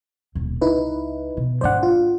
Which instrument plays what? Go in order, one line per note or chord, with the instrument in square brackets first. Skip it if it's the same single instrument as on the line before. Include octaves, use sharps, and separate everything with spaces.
[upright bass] D#1 B2
[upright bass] C#2 [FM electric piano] D#4 E4 B4
[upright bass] B2
[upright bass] G#1 D4 [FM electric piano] C5 D5 F#5
[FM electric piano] F4